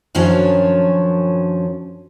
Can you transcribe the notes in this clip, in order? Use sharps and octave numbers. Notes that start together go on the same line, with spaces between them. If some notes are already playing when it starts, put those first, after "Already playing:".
F#2 D#3 F3 F#3 C#4 D4